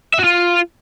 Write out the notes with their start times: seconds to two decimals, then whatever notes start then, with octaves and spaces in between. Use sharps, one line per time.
0.14 E5
0.19 F#4
0.24 F4